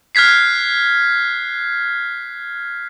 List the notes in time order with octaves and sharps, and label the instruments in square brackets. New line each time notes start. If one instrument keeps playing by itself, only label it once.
[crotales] F6 F#6 G#6 B6 C7